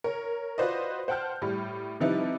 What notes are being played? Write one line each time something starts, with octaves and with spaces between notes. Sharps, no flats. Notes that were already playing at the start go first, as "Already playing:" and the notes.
A#4 C#5
F4 F#4 B4 C5 D5 D#5
C5 F#5 G5 A5 F6 G6
A2 G3
C3 F3 G3 D#4 E4 B4